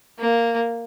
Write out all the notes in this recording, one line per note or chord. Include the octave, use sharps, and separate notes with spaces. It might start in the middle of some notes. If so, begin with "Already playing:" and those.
A#3